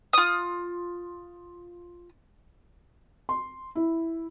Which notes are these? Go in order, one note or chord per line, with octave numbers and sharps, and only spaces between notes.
F4 D#6
C6
E4